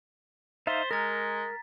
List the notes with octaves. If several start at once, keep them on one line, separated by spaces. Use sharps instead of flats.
D#4 C5 E5 F5 A6 B6
G#3 A#4 A#5 F6 A6